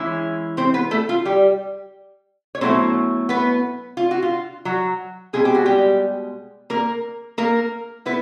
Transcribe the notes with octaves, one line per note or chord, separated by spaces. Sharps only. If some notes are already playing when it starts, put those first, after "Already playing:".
Already playing: E3 G#3 C#4 E4
C4 C5
B3 B4
A3 A4
F4
G3 G4
C#5
B2 F#3 A3 C4 C#4 E4 C5
B3 B4
F4
F#4
F4
F#3 F#4
B2 G#3 C4 G#4
G4
F#4
G3 G4
A#3 A#4
A#3 A#4
B3 E4 B4